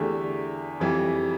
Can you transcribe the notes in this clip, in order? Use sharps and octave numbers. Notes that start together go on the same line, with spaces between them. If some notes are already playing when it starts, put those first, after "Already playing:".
Already playing: E2 D3 A3 G4
F2 E3 G3